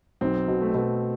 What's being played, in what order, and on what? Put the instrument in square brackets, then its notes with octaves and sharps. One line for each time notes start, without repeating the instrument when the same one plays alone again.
[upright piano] B1 [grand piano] C4
[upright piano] B2
[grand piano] A3
[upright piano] B2